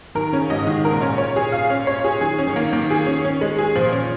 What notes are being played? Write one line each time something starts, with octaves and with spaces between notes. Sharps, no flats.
D#3 A#4
C#3 C#4
G#2 D#5
G#2 D#3
A#4
A#2
C#4
C#5
G#4
F5
C#4
C#5
G#4
D#3 G#4
C#4
D#3
A#3
D#3 A#3
G#4
C#4
C#4
G#3
G#4
A#2 F3
C#4